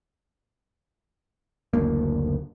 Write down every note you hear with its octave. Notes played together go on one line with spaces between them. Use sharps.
F#1 D2 A#3